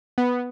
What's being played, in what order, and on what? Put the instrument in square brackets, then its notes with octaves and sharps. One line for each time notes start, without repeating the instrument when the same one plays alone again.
[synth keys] B3